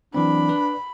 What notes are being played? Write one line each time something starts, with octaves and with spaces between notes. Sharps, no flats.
E3 F#3 C4 D4 B5
B4 D5